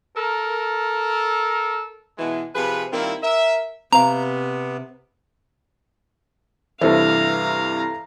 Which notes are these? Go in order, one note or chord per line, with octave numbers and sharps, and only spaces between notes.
A4 A#4
B2 E3 G#3
C3 F3 G#4 B4
D#3 G3 A#3 C4 E4 F4
A#4 E5
C3 B3 C4 F5 A#5
G2 C3 E3 E4 A4 C5 F5 A#5